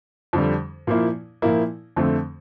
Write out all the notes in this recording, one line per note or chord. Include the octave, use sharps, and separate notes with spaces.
F2 D3 G3
A#2 F3 A#3 E4
A#2 F3 A#3 E4
F2 D3 A3 C4